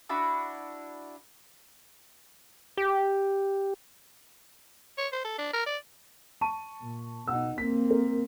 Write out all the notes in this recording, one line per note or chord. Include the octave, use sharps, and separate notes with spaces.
D4 E4 F#4 B5
G4
C#5
C5
A4
D4
A#4
D5
A5 C#6 D#7
A#2
B2 D#4 F#5 E6
A#3 C4 B6
A#4